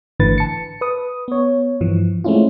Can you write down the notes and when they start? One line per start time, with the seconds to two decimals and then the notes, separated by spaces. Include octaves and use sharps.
0.20 G#1 A2 D3 E3 B4 A6
0.38 A5 C#7
0.81 B4 D#6
1.28 B3 C#5
1.81 G2 E3 F3
2.24 G#3 A3 C4 C#4 E4 F4